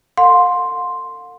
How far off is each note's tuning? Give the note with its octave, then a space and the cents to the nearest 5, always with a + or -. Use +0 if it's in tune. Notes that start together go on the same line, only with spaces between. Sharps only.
A4 +45 F5 +45 C6 +0